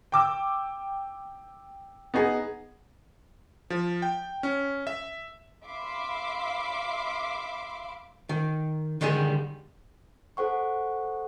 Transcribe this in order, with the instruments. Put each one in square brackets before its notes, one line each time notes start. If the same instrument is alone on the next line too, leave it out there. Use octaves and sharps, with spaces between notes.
[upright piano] G5 D6 E6
B3 D#4 G#4
[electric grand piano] F3
G5
C#4
E5
[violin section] E5 F5 B5 C6 D6
[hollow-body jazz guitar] D#3
D3 D#3 G3 G#3 G#4
[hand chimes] A4 C5 F#5 C#6